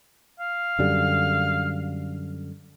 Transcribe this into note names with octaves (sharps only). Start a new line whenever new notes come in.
F5
F#2 D3 G3